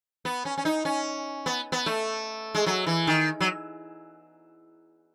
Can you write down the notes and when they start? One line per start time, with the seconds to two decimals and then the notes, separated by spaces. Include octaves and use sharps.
0.25 B3
0.45 C#4
0.58 C#4
0.65 D#4
0.85 C#4
1.46 B3
1.72 B3
1.86 A3
2.55 G#3
2.66 F#3
2.87 E3
3.07 D#3
3.40 F#3